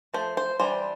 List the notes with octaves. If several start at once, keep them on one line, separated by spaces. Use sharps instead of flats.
F3 A3 C5
C5
E3 G3 D4 C5